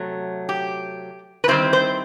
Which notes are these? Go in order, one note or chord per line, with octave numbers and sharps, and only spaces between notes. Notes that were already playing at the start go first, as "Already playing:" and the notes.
Already playing: C3 F#3 A3
G4
B4
D#3 G3 C4 E4 C5
C5